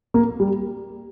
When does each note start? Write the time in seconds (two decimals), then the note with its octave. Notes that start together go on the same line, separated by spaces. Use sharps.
0.14 A#3
0.40 G3